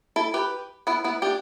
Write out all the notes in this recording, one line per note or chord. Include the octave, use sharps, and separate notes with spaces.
E4 A4
G4 B4
B3 E4
B3 E4
D4 G4